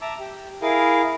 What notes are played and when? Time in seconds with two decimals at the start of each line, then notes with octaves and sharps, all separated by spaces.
0.01 E5 A5 A#5 D6 E6
0.19 G4
0.62 E4 G#4 A#4 F5